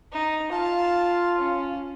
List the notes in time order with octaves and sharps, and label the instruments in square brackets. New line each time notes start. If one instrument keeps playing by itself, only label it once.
[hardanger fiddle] D#4
[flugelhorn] F4 [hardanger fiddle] F5 A5
[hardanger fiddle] C#4